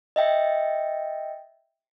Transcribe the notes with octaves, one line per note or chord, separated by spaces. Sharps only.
D#5 E5 G5